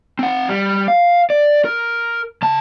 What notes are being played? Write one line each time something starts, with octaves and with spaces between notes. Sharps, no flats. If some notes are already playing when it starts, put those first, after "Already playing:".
C4 F#5
G3
F5
D5
A#4
C#3 A5